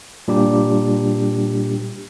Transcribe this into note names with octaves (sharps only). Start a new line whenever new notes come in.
A#2 G3 D4 G4